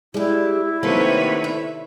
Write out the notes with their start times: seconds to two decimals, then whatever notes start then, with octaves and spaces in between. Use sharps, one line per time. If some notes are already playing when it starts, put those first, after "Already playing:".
0.14 G3 G#3 E4 G4
0.83 C3 D#3 A3 A#3 C4 F#4 B4 C#5
1.44 E5